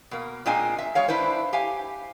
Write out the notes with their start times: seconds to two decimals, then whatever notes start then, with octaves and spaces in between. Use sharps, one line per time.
0.11 B2 A#3
0.46 A#2 G#3 C4 D4 D#5 G#5
0.78 E5
0.95 F#3 G#3 C#5 F5
1.08 D4 E4 B4 C5
1.53 G4 F5 G#5